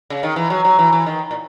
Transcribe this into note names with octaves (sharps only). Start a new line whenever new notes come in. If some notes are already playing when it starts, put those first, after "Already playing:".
C#3
D#3
E3
F#3
F#3
E3
E3
D#3
A#2